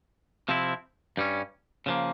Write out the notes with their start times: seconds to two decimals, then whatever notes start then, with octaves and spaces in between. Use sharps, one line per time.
0.49 C3 F3 C4 E4
1.17 G2 G3 C#4
1.86 C#3 F3 A#3